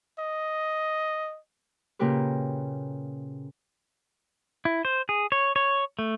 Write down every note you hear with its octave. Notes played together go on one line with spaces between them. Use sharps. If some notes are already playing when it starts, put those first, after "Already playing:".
D#5
A#2 C#3 A#3 G4 A#4 B4
E4
C5
G#4
C#5
C#5
A3